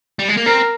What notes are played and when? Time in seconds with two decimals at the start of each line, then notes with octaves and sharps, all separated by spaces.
0.19 G3
0.28 G#3
0.37 A#3
0.46 C4 A#4